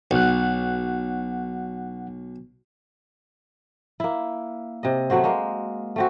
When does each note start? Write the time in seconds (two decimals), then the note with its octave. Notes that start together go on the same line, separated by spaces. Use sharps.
0.11 B1 F#5 F#6
4.00 A#3 E4
4.83 C3 D#5
5.10 F#3 A3 F#4 C5
5.24 G#3 A#3
5.96 A3 C4 F#4